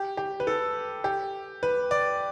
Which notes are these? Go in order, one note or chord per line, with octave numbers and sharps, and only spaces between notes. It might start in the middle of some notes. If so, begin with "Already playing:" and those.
Already playing: G4
G4
B4
A4
G4
B4
D5